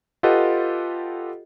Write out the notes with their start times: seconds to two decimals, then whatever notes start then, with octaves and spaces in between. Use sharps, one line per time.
0.23 F4 G4 A4 B4 D#5 F#5